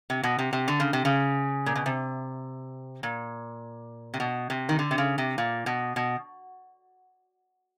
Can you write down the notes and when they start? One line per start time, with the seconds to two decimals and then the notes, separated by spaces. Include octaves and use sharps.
0.10 C3
0.23 B2
0.39 C3
0.53 C3
0.68 D3
0.80 C#3
0.93 C3
1.05 C#3
1.66 A#2
1.75 B2
1.86 C3
3.03 A#2
4.14 C3
4.20 B2
4.50 C3
4.69 D#3
4.79 D3
4.91 C3
4.98 C#3
5.18 C3
5.38 A#2
5.66 B2
5.96 B2